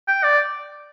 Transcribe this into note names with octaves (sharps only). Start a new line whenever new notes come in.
G5
D5